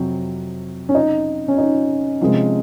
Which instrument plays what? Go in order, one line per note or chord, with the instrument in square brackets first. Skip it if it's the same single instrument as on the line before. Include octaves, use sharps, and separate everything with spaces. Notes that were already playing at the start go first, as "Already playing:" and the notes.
Already playing: [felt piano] F2 C3 F#3 C4
[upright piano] C#4
D#4
C#4
D#4
[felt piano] C3 F3 G#3